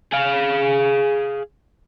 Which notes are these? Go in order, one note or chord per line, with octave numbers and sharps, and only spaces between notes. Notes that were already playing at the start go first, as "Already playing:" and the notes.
G#4 F5